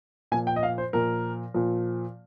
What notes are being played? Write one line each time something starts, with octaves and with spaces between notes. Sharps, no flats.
A#2 F3 G#5
G5
D#5
F5
C5
A#2 F3 A#4
A#2 F3